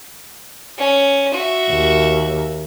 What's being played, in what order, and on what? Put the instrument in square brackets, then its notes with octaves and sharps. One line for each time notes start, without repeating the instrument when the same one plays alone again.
[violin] C#4
F#4 E5
[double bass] D#2